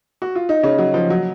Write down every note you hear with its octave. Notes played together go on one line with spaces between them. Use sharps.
F#4
F4
D#4
C#3 C#4
F#3
F3
F#3